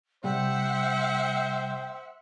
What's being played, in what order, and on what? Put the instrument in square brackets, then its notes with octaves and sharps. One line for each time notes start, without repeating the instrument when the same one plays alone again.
[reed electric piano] C3 G3 [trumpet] C5 [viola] E5 F#5 [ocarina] G5